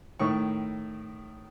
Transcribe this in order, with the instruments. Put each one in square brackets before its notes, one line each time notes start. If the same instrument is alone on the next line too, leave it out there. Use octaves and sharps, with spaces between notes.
[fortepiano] A2 D#3 C#6